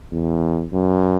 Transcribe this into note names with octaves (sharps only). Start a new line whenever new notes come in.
E2
F#2